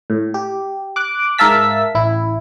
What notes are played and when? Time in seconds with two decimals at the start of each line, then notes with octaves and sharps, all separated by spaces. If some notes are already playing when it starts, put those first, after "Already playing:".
0.10 A2
0.34 G4
0.96 D6 F#6
1.38 G#2 A#4 E5 F5 A5 B6
1.95 A1 E4